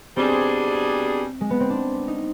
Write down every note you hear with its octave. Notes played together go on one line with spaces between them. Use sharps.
B2 G3 C4 D4 G#4
G#3
B3
C4
D4
D#4